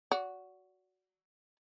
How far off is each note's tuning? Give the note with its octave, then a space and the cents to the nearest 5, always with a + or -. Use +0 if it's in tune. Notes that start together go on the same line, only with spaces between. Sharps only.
F#4 +0 D5 -35